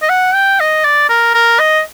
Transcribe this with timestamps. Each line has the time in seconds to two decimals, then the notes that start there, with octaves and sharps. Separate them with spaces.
0.02 D#5
0.09 F#5
0.34 G5
0.60 D#5
0.85 D5
1.09 A#4
1.34 A#4
1.59 D#5